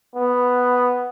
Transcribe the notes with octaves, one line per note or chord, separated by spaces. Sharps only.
B3